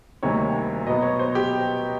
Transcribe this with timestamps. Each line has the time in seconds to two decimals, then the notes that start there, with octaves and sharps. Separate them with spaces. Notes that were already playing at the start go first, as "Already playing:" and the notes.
0.23 D2 C3 D#3 G3 A#3 C#5
0.86 B2 F#3 B3 D#5
1.02 C#5
1.19 C5
1.35 G4